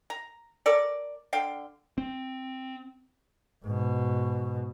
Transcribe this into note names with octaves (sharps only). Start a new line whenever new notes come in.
A#5
A4 A#4 C#5 D5
D3 F5 G5
C4
G#2 B2